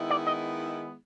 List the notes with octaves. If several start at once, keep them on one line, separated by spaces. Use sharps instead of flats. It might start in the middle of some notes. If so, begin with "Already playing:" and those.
Already playing: D#3 G#3 B3 E4
D5
D#5